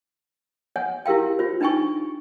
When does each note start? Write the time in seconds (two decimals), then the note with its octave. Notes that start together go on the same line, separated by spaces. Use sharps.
0.76 C#5 F#5 G#5
1.06 E4 G4 A#4 F5 G5
1.39 F4 C5
1.61 D4 D#4 G5 G#5 C#6